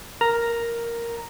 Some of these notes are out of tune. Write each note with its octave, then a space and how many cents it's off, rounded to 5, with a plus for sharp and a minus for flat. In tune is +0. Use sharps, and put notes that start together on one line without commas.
A#4 +0 A#5 +0